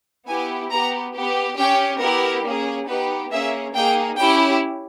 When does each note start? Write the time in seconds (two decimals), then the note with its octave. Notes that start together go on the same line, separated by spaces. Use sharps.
0.27 B3 E4 G4 G#5
0.71 B3 G4 A#5
1.14 B3 G4
1.57 C#4 G4 G5
2.01 B3 E4 G4 A#4
2.44 A#3 C#4 G#4
2.87 B3 D#4 G4 B4
3.30 A#3 C#4 G#4 E5
3.74 A#3 D#4 G#4 G5
4.17 C#4 E4 G4 G5